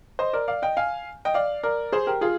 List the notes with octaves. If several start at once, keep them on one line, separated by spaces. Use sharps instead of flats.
C5 D#5
A#4 D5
D5 F5
D#5 G5
F5 G#5
D#5 G5
D5 F5
A#4 D5
G#4 C5
G4 A#4
F4 G#4